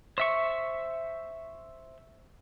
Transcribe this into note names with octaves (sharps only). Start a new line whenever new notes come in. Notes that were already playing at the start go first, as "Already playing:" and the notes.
C5 E5 C#6